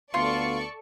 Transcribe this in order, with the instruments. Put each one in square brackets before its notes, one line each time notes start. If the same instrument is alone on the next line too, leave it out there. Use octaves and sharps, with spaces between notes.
[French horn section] D2 B3 [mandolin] F4 [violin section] A4 D5 C#6